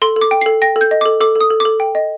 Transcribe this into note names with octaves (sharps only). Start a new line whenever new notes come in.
A4 C6
A4
D6
G5
A4 C7
G5 A#6
A4
G6
D#5
A4 D6
A4 D6
A4 D#6
A4
D6
A4
G5
D#5